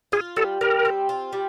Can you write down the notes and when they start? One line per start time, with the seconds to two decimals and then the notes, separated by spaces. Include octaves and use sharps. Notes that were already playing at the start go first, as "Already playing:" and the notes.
0.12 F4 G#4
0.36 G3 A4
0.61 G3 A#4
0.85 C4
1.09 F4
1.33 G3